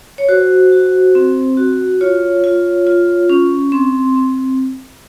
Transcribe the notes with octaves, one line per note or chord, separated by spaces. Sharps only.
C#5
F#4 C5
F#4
C4
F#4
F4 C#5
F4
F4
C#4
C4 C6
C4